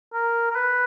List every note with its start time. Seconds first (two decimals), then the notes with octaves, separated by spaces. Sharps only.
0.14 A#4
0.50 A#4
0.56 B4